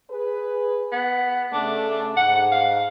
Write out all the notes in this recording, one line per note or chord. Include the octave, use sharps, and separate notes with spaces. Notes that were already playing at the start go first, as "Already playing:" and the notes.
G#4 B4
B3
C#3 A3 D4
G#2 F#5
F5